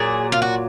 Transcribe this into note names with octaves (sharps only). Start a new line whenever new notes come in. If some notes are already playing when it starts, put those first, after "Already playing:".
Already playing: A#2 F#3 G#4
F4
F#4